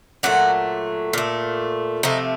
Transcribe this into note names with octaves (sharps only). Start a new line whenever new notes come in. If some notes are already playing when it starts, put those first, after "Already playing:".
A#2 F#3 A3 F#4
A#2 A3
C3 F3 A3 D#4